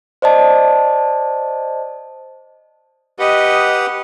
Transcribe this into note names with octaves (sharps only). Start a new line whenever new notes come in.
C5 D5 D#5 A5
G4 B4 D#5 F#5